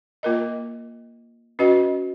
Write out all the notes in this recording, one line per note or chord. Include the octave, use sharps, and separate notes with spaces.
A#3 F4 A#4 D#5
C#4 F#4 B4 D#5